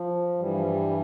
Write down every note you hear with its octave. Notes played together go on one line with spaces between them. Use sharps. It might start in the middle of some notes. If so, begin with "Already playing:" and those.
Already playing: F3
G2 E3 G3
F3
G3